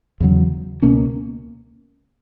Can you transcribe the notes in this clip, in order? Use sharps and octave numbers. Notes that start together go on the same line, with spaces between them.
E2 C#3 F#3
C#2 B2 A#3 C#4